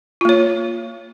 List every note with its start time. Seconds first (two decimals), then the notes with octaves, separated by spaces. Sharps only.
0.21 F4
0.25 A#3
0.29 C#5